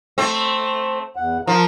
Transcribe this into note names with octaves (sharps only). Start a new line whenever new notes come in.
A3 C4
E2 F#5
F3 A#4 A#5